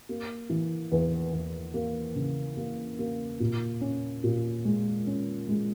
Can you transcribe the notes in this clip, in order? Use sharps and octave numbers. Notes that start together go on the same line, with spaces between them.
A#3
E3
E2
E2
A#3
C#3
A#3
A#3
A#2
C#4
A#2
G#3
C#4
G#3